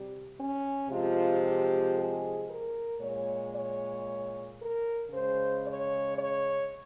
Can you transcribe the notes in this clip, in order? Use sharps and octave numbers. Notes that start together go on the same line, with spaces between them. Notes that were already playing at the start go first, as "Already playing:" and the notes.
Already playing: C3 G3
C#4
C3 F3 G#3 F4
G4
G#4
A#4
A#2 G#3 C#5
C#5
A#4
C#3 G#3 C5
C#5
C#5